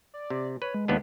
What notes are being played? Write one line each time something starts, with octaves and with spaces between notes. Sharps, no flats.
D5
C3
B4 C#5
G#3
D#2 B3 D4